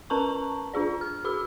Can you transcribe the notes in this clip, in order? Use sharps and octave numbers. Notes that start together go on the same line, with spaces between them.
C#4 A#4 B4 A5 A#5 C#6
D4 F4 G#4 D5
F6
F#4 G#4 B5 E6